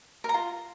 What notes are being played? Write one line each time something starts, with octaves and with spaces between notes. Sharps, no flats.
A#4
A#5
F4